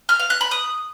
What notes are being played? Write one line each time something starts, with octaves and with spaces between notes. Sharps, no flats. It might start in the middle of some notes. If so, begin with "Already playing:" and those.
F6
F5
F#6
B5
D#6